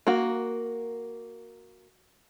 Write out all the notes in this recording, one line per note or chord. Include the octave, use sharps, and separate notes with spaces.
A#3 F#4